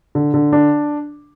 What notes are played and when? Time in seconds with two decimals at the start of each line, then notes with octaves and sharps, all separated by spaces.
0.15 D3
0.34 D3
0.53 D4